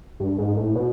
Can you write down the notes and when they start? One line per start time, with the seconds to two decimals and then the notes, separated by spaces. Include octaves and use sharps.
0.20 G2
0.38 G#2
0.57 A2
0.75 B2